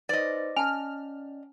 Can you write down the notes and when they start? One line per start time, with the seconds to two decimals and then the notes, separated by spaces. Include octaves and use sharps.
0.09 D#4 B4 C5 D5 D#5
0.56 C#4 G#5 A5 F6